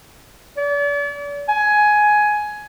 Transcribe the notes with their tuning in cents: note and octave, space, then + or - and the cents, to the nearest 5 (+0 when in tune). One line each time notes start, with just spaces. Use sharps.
D5 -40
G#5 +15